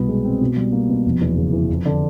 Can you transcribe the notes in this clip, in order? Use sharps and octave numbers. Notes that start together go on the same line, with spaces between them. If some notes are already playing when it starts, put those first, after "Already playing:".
Already playing: C2 B2 B3
G#3
C4
B2
G3
A#3
B2
F1
E2
C#3
E3
F2
D3